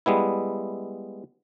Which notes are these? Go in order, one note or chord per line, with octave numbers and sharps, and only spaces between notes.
G3 G#3 B3 E4